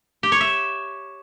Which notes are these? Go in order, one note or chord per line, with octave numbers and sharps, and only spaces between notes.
G4
C#5
E5